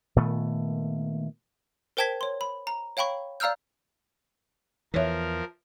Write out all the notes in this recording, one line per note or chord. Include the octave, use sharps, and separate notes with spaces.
A#2 D#3 A3 B3
A#4 C5 G5 A5 G#6 B6
C#5 C6
B5
A#5
C#5 F5 G5 B5 C#6
D5 F5 A#5 E6 F6 G6
E2 E3 F3 A#4 B4 C#5 E5